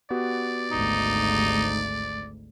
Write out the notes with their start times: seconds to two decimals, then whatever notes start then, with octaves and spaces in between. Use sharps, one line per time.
0.10 B3 F#4 G4 D5
0.71 G#1 D2 D#4